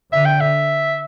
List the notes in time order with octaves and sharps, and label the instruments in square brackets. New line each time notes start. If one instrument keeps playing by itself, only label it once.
[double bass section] D3 [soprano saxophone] E5
[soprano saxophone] G5
E5